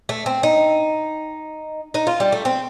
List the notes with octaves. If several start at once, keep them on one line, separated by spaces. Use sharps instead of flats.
A3
C4
D#4
D#4
F4
G3
A3
C4